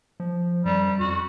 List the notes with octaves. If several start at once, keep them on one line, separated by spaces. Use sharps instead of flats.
F3
F#2 G3
F2 F#4